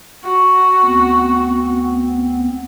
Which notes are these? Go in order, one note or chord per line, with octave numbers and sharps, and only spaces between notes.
F#4
D2 B3 C4